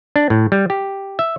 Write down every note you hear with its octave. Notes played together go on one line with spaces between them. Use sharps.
D4
A2
G3
G4
E5